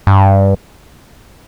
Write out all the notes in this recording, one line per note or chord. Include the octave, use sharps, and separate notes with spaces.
G2